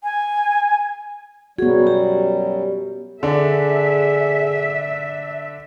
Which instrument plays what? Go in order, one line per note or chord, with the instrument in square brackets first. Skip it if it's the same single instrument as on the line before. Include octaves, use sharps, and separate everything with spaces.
[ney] G#5
[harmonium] F#2 F#3 G3 [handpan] B3 F#4 [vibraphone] G#4
[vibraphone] G4
[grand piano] D3 D4 [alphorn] G#4 [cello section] E5